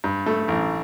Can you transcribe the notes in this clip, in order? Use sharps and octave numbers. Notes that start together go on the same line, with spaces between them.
G2
A3
A1